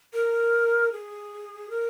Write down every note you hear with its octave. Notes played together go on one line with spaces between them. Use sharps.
A#4
G#4
A#4